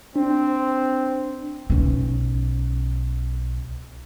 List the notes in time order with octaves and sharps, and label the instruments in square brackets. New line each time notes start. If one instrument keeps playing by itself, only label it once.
[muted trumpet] C4 [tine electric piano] D4
[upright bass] B1 C#4